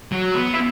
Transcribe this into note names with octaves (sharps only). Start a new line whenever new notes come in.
F#3
B3
E4